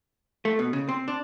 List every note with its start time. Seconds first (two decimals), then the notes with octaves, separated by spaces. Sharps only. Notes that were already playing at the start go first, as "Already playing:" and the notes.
0.45 A3
0.59 B2
0.73 C#3
0.89 C4
1.08 D4